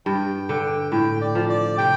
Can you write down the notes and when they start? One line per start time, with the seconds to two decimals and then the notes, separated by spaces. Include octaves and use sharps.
0.06 G2 G5
0.49 D3 G5
0.92 A2 G5
1.21 D5
1.35 F3
1.49 D5
1.78 C3 G5